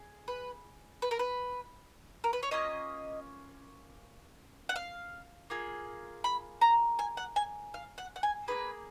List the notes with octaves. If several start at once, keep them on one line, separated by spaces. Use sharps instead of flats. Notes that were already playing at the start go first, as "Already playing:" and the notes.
Already playing: G#4
B4
B4
A#4
B4
A#4
B4
C#5
A#3 C#4 F4 D#5
F#5
F5
A#3 F4 G#4
B5
A#5
G#5
F#5
G#5
F5
F#5
F#5
G#5
A#3 C#4 G#4 B4